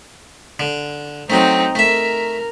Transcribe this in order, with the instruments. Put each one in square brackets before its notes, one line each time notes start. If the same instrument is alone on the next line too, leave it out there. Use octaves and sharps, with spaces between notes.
[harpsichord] D3
[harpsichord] F#3 A3 [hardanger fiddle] C4 D#4
[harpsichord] A3 E5 [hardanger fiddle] A#4